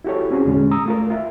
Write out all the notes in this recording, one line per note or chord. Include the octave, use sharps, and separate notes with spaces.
E4 F#4 G4 A4 C#5
C4 C#4 F#4 G#4
E2 A#2 D3 G#3 C#4
A#5 D#6 E6
A3 F4 A#4
F4 A#4 E5